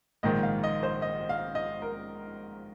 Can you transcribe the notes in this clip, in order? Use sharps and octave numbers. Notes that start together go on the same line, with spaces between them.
A#1 G#2 D#3 D#5
F5
D#5
C5
D#5
F5
D#5
A#4